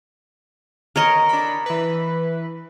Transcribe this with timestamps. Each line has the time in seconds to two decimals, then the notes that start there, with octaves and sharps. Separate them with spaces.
0.96 A#4 C#5 D#5
1.29 D4 B5
1.66 E3 B4